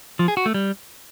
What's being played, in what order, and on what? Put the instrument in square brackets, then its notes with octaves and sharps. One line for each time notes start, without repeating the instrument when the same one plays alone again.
[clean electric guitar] F3
G#4
F#4
A3
G3